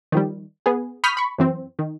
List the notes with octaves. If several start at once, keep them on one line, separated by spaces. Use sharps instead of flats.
D#3 F3 G3
B3 G#4
B5 C#6 D#6 F6 G6 B6
B5 C#6
F#2 E3 C4
D#3